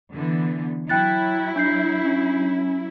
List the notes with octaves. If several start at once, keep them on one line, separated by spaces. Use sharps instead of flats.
D3 E3 B3
F#3 E4 G5 F#6 A6
D4 G6 C7
C#4